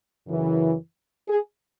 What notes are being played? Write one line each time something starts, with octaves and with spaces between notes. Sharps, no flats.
F#2 C#3 E3
G#4